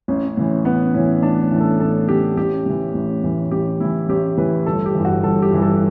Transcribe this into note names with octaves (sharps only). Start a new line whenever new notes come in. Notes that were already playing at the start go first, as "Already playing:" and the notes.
A1 C#4
A2 E3
A1 B3
A2 E3 C#4
A1 D4
C#4
E3
A2 A4
A1 A4
A2 E3 G4
A1 G4
A2 E3
A1
A2 E3
A1 G4
A2 E3 E4
A1 G4
A2 E3 B4
G1 A4
G4
G2 E3
F#4
G1 A4
G4
G2 E3
A4